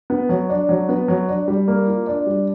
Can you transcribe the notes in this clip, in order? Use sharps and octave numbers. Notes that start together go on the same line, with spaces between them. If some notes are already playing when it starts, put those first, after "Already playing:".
B3
F#3
D4
F#3
B3
F#3
D4
G3
A#3
F4
D4
G3